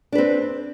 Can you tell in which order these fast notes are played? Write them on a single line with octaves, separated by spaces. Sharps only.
D4 B4 C4